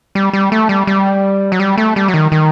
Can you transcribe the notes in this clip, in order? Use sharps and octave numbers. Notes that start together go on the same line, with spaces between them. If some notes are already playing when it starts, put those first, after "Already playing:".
G3
G3
A3
G3
G3
F#3
G3
A3
G3
F#3
D#3
D#3